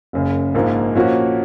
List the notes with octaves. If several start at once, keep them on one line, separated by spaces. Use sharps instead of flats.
F#1 F#2 C#3
A#1 G#2 F3 A#3
A#2 F3 A#3 C#4 F#4